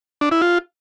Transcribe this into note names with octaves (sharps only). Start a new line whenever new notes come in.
D4
E4
F4